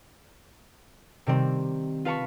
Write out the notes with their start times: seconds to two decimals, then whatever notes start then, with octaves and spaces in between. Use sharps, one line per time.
1.26 C3 D#3 G3 C4
2.05 F4 B4 F5 A5 B5 C#6